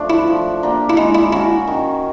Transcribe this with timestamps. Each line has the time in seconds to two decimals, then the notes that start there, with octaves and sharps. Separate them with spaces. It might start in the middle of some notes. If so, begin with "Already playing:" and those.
Already playing: F3 A3 D4
0.10 E4
0.27 F3
0.63 A#3 D4 G4
0.90 E4
0.97 G#3 D#4
1.15 E4
1.32 C#4 E4 F#4
1.67 D#3